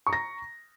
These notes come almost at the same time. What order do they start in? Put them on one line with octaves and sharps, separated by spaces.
C#6 A#5 A#6